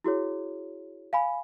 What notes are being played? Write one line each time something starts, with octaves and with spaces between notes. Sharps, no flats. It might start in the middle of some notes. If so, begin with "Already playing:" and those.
E4 F#4 G#4 C#5
F5 G#5 B5